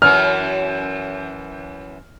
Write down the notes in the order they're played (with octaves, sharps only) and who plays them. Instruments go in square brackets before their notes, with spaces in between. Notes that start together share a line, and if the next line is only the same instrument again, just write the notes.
[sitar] F#2 E3 [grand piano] F6